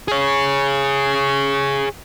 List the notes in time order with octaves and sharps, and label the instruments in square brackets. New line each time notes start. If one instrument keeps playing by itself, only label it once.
[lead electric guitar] G#4 C#5